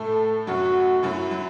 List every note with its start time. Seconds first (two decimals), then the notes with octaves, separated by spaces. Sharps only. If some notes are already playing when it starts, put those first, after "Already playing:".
Already playing: A2 A3 A4
0.47 F#2 F#3 F#4
1.03 F#2 F#3 E4
1.31 F#3